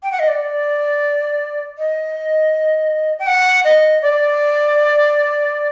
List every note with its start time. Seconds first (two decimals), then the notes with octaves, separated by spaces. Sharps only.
0.03 G5
0.12 F#5
0.19 D#5
0.28 D5
1.78 D#5
3.19 G5
3.27 F#5
3.64 D#5
4.02 D5